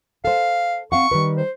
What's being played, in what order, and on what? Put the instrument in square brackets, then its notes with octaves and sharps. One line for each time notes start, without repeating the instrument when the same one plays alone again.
[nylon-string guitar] A4 C5 [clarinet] F5
[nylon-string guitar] C4 F5 F#5 [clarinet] C#6
[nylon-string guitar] D#3 G3 B4
[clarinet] C5